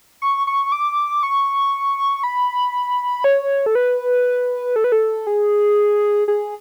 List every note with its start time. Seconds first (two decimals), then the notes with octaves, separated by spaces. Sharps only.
0.22 C#6
0.47 C#6
0.72 D6
1.23 C#6
2.23 B5
3.24 C#5
3.66 A4
3.75 B4
4.76 A4
4.84 B4
4.92 A4
5.27 G#4
6.28 G#4